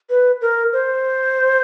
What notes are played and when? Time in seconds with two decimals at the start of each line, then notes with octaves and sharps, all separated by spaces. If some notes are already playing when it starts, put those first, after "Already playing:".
0.10 B4
0.41 A#4
0.73 C5